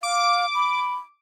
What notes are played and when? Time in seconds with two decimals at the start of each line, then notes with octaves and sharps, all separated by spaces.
0.03 F5 D6
0.55 B5